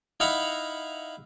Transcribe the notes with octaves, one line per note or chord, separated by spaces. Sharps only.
D#4 E4 F5 F#5 A#5 B5